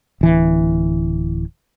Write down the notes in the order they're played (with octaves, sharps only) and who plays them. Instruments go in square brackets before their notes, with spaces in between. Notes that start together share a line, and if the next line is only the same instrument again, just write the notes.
[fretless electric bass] D1 E3